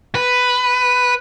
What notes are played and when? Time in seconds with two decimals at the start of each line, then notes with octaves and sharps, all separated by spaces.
0.15 B4